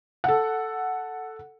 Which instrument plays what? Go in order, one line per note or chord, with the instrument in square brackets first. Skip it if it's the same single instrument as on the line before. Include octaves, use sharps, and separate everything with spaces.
[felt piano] A4 F#5